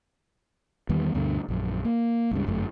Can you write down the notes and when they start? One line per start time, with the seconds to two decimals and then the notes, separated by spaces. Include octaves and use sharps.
0.89 E2 D#3 G3 B3
1.14 D2 G2 B2 D3
1.49 A#1 F#2
1.85 A#3
2.31 C#2 G2 C#3
2.47 G1 F#2 A3